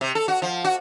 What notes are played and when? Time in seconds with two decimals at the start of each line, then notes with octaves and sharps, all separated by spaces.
0.01 C3
0.15 A4
0.28 F#4
0.42 F3
0.64 F#4